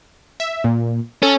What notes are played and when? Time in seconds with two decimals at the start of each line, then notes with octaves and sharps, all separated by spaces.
0.40 E5
0.64 A#2
1.23 C#4 A4